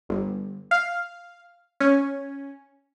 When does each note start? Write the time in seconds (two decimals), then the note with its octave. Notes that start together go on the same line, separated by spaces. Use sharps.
0.09 G1
0.71 F5
1.80 C#4